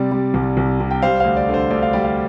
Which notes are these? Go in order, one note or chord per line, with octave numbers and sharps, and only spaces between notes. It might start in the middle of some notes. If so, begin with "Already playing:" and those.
Already playing: C3 G3 D5
G3
C2
C2
C3
G5
G3 C5 F5
D2 C5 F5
D5
D3
C5
D2 D5
F5
G3 D5
F5